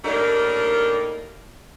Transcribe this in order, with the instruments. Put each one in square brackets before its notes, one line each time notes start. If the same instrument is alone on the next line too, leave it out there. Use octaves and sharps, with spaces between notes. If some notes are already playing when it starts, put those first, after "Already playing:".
[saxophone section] A2 G3 A#3 D4 D#4 A#4